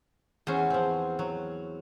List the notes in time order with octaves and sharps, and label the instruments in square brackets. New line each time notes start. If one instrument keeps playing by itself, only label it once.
[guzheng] E2 [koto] C#4 C5
[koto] F3 C4
F#3